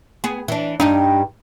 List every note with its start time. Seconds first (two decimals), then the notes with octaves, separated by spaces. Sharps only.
0.24 B3 G#4
0.48 E3 D4
0.80 G2 G3 D4 D#4